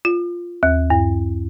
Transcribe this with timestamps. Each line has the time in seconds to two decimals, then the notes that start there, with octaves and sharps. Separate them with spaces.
0.05 F4
0.63 D#2
0.90 G2